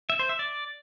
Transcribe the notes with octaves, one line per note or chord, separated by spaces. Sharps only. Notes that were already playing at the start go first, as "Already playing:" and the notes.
E5
C5
E5
D5